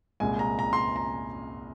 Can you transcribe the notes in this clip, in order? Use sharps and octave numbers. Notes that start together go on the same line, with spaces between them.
C2 A#2 G#3 G#5
A#5
A#5
C6
A#5
A#5